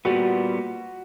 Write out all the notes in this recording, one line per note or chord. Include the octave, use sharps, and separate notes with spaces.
A#2 G3 B3 F#4